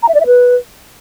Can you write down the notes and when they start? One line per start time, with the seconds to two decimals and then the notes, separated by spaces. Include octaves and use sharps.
0.03 A#5
0.09 E5
0.14 D5
0.20 E5
0.26 B4